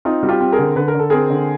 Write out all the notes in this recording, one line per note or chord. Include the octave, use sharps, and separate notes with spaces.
C4 D#4 F4
G3 F#4
F4 G4
C4
G#4 A#4
D3
D3 B4
A#4
D3 A4
C4 G#4 A#4
D3